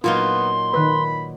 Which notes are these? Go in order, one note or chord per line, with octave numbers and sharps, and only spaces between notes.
A#2 F#3 B3 D#4 F4 C6
D#3 B4 B5